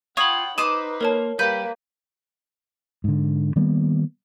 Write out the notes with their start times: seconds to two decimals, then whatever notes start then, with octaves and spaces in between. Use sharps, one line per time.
0.17 F4 C#5 F#5 G5 B5 C#6 D#6 G#6
0.58 D#4 B4 C5 D6 D#6 E7
1.01 A#3 A#4 C#5 A5
1.39 G3 A#3 G4 B4 G6
3.04 G#2 D3
3.56 D#3 G3 A#3 B3